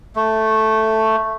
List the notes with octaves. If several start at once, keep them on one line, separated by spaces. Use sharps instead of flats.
A3